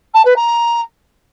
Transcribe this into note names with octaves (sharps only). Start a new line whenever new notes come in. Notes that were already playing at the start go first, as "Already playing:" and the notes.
A5
B4
A#5